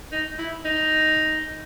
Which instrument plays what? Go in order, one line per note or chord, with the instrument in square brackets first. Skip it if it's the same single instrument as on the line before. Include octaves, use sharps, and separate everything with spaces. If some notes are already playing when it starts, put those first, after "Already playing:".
[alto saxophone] D#4
E4
D#4